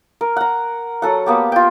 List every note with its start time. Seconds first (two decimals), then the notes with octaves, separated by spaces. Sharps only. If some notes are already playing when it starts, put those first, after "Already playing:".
0.21 A#4
0.36 F#5 A#5
1.02 F#3 A4 F#5
1.26 A#3 B3 G4
1.52 F4 G5